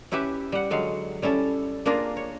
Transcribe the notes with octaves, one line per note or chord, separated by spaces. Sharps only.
C#4 E4 G4 B4 E5
G3 F#5
D3 F#3 G#3 F5
G3 C#4 E4 A4
A#3 D4 F4 G#4 A#4
C#5